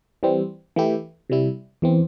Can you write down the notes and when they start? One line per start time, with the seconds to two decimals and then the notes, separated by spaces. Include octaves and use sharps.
0.23 E3 G3 C4
0.76 E3 A3 E4 G4
1.30 C3 G3 E4
1.82 E2 E3 C4